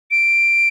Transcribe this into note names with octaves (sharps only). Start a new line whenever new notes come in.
D7